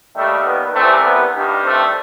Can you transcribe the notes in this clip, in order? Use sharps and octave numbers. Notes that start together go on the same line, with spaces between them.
D#2 D#3 G3 A3
B3
C2 C3 E3 G3 A3 C4
B3
G2 D#3 G3
A3 C4